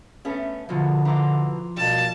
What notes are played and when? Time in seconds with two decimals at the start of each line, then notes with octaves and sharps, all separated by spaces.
0.25 A3 B3 C#4
0.69 E2 B2 D3 F3 F4
1.05 B2 E3 A#5 C6 D6
1.77 B2 G3 A#3 A5